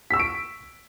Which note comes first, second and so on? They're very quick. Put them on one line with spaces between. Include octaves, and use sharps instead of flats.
B6 E6 C#6 D7